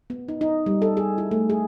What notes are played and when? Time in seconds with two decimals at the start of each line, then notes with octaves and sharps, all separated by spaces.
0.10 B3
0.28 D#4
0.41 D#4
0.66 G3
0.82 A4
0.97 G#4
1.18 E4
1.31 A3
1.50 G#4